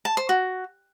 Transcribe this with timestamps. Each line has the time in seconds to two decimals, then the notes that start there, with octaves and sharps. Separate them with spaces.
0.05 A5
0.17 C5
0.29 F#4